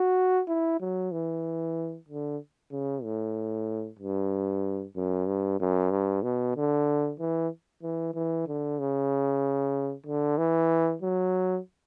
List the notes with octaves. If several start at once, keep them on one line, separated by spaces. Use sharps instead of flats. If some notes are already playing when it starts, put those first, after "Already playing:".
Already playing: F#4
E4
F#3
E3
D3
C#3
A2
G2
F#2
G2
F#2
G2
B2
D3
E3
E3
E3
D3
C#3
D3
E3
F#3